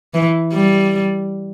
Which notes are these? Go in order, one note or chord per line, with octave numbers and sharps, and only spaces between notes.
E3
G3